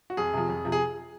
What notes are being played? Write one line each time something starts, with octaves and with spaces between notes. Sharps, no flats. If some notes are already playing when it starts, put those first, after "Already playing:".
F#4
F2 G#4
C3 F3
F2
C3 F3
G#4